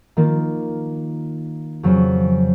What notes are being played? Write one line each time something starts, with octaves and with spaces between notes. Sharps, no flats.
D#3 A#3 F4
F2 C#3 F#3 C#4